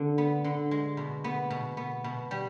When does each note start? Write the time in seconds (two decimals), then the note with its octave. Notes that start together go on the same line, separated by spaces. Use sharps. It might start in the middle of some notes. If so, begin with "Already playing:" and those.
Already playing: D3
0.18 B3
0.44 D3
0.71 G#3
0.97 B2
1.24 B3
1.50 B2
1.77 B3
2.04 B2
2.31 G3